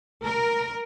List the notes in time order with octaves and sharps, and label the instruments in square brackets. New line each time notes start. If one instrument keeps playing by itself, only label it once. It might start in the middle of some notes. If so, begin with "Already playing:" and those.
[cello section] A#4